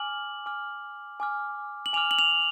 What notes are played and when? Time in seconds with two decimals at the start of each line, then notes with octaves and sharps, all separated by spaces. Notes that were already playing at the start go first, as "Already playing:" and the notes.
Already playing: G#5 D6 F6 F#7
0.46 G#5 D6 F6
1.20 G#5 D6 F6
1.86 F#7
1.93 G#5 D6 F6 F7
2.11 F#7
2.19 F7